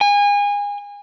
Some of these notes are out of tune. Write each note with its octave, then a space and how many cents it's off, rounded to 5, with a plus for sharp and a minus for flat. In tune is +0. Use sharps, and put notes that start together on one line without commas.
G#5 -30